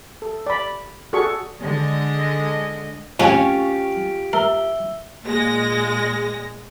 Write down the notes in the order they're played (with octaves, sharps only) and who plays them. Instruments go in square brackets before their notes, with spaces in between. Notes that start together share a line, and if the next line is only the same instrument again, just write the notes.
[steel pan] A4
D5 B5
F#4 G#4 A4 D5 C#6
[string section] D3 G#3 D#5
[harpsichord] F2 C#3 G#5 [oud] C#4 [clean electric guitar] F4 G4 F5
[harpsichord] A#4 [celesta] E5 E6 G7
[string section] A#2 G#3 A#6